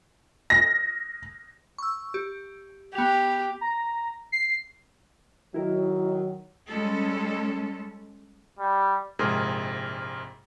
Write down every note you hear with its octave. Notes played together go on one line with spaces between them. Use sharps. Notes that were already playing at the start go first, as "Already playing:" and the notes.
A#6
C#6 E6
G4
B3 G4 F7
A#5
C7
D#3 F#3 E4 A#4
G3 G#3 C#4 A4
G3
A#1 G#2 C3 G#4 A#4